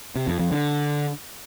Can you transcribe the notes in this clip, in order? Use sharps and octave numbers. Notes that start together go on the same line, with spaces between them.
C3
F2
F2
D3